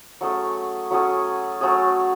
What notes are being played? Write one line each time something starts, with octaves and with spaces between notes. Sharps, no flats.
F#3 A3 C#4 G#4
F#3 A3 C#4 G#4
F#3 A3 C#4 G#4